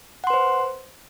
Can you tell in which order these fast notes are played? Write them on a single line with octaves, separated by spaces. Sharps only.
F#5 C6 B4 C5